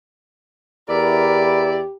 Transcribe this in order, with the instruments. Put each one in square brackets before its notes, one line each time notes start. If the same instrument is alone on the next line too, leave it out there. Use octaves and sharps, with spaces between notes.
[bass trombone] E2 [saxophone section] E4 D5 [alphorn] G4 [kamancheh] A#4 B5